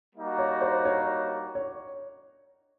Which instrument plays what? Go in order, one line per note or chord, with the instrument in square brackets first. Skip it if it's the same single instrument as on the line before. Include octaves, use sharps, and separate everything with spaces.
[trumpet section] G3 A#3 D#4 F#4
[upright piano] C#5
C5
C#5
C#5